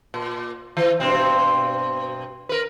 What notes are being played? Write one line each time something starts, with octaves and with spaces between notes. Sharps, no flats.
A#2
E3
G2 B2 C4
A#4 B4